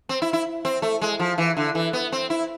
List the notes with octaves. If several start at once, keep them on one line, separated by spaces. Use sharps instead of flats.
C4
E4
E4
C4
A3
G#3
F3
E3
D3
E3
B3
C4
E4